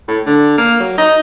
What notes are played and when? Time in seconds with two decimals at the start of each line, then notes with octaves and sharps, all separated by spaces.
0.08 A2
0.26 D3
0.58 A#3
0.80 F#3
0.98 D#4